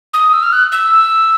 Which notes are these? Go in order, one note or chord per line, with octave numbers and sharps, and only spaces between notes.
D#6
E6
F6
F#6
E6